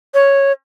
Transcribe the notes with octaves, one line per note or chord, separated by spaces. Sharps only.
C#5